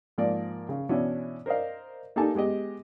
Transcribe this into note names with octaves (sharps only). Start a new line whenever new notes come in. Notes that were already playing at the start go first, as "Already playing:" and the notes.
G#2 F3 A#3 A#4 D5
C#3
B2 E3 C#4 D4 E4 F#4
A#4 C5 D5 D#5 F5
A#3 D#4 G4 A4 G#5 A5
G#3 B3 G4 D#5